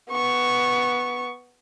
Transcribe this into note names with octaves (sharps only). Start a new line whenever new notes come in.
B3 C#6